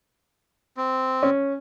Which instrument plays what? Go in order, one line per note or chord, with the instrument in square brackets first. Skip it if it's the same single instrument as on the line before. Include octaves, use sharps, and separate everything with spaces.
[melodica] C4
[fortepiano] C#4